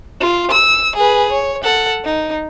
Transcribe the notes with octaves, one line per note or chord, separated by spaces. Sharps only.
F4
E6
G#4 B4
C#5
A4 F#5
D#4